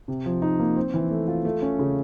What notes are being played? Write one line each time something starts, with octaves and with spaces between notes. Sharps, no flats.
C3
F3
D#4
A#3
C4
E3
A3
F4
A3
C#4
C#3